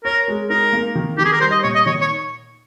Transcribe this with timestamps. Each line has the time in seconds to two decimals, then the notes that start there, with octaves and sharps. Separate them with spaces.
0.05 A#4 C#5
0.28 G#3
0.50 D#4 A#4
0.73 A#3
0.95 D#3
1.18 D#3 G4
1.25 G#4
1.33 A#4
1.41 G3 C5
1.52 D#5
1.64 A#2 C#5
1.75 D#5
1.86 D#3 C#5
2.01 C#5